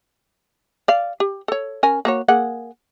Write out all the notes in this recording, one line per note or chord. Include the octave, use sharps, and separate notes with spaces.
D5 F5
G4
A4 C#5
C#4 A#4 G#5
A#3 F#4 C#5
A#3 G#4 F#5